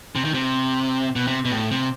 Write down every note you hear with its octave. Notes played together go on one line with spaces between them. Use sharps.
C3
D#3
C3
B2
C3
B2
A2
C3